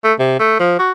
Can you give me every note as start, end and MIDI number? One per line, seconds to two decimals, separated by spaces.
0.04 0.13 57
0.19 0.35 48
0.40 0.57 57
0.59 0.79 53
0.79 0.92 66